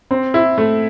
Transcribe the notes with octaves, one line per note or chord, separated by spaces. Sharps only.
C4
E4
A3